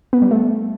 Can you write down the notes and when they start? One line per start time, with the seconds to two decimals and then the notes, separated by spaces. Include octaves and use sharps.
0.13 B3
0.22 G3
0.31 A3